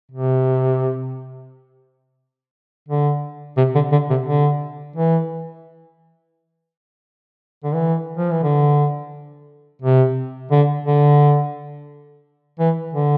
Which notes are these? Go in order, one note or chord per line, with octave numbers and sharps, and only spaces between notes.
C3
D3
C3
D3
D3
C3
D3
E3
D3
E3
F3
E3
D3
C3
D3
D3
E3
D3